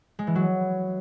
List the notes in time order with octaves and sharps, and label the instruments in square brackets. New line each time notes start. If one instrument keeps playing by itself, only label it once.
[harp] G#3
E3
F#3